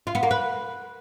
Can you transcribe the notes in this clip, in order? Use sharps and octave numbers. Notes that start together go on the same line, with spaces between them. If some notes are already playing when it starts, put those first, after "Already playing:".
F4
B3
A#3
B4